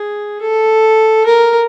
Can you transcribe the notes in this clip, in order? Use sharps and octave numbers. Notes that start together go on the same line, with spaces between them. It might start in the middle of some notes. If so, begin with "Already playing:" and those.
Already playing: G#4
A4
A#4